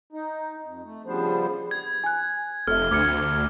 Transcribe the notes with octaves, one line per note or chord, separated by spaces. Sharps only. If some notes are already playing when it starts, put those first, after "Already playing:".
D#4
F2
A3
C#3 F3 G3 B3 D4 C5
G#6
G#5 F#6
F1 A4 E5 F6
D2 D6 G#6 C#7